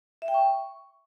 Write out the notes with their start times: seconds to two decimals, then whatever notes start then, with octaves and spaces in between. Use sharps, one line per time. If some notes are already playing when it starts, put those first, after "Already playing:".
0.22 E5
0.28 G5
0.34 C#6